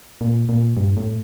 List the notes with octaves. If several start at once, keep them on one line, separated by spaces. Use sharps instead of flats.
A#2
A#2
G2
A2